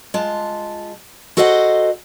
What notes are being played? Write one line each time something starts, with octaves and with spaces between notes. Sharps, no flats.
G#3 F4 A5
F#4 A4 C5 D#5 E5 F#5